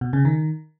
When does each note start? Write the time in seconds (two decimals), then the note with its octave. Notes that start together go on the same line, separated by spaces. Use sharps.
0.01 B2
0.13 C#3
0.25 D#3